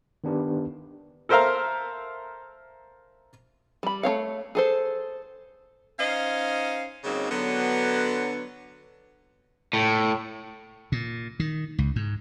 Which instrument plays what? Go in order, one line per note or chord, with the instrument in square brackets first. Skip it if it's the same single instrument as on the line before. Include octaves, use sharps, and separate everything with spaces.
[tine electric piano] D#3 B3 D4 G4 B4
[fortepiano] A4 A#4 C5 E5 F5 A#5
[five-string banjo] G3 B5
A3 C4 C#5 F5
G#4 A4 C5
[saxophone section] C#4 D#4 C5 D#5 F5
C#3 F#3 G#3 A#3 C4 D#4
D3 F#3 B3
[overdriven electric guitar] A2
[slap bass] A#2
D#3
C#2
G#2